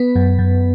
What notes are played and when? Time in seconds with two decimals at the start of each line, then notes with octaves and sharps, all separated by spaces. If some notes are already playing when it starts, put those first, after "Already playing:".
Already playing: B3 B4
0.16 F#2
0.39 F#2